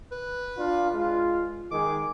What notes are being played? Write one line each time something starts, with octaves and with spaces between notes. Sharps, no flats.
B4
D4 F4
G#3 F4
D#3 G#3 G#4 D6